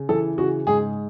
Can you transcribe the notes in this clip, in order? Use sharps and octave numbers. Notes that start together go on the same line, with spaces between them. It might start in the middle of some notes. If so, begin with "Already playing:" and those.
Already playing: C#3
E3 A4
C#3 F#4
G#2 G#4